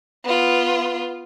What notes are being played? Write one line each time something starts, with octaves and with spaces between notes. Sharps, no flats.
B3 F4